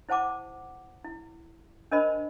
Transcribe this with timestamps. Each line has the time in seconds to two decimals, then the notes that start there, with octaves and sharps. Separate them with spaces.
0.09 E4 C5 F#5 A5 D6
1.04 E4
1.91 D4 A#4 C5 D#5 A5 B5